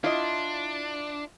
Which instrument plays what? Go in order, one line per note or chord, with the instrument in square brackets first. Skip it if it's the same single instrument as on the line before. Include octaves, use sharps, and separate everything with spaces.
[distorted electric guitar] D4 [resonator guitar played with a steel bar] E4 F4 [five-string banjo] D#5 F5